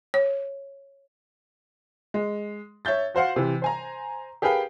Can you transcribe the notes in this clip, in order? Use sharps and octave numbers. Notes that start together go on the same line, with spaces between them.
C#5
G#3
C#5 E5 G6 A6
F#4 C5 F5 F#5
C3 E3
C5 G#5 A#5
G4 G#4 A#4 B4 F5 G5